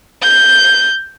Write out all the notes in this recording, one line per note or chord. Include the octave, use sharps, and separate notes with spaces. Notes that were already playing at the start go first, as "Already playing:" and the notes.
G6